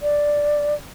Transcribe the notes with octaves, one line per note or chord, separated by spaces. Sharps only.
D5